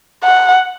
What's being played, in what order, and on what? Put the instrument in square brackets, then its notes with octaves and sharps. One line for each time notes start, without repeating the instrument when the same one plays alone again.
[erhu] F#5